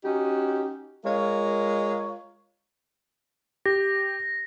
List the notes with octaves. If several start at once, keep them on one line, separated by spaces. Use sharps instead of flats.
C#4 D#4 F#4 G4
G#3 F4 A#4 C#5
G4 A#6